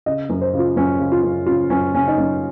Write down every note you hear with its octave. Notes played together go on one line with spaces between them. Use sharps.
C#3 D#5
F#2
C5
C#3
F4
F#2 C#4
C#3
F4
F#2
C#3 F4
F#2 C#4
C#3 C#4
D#4
F#2 C#4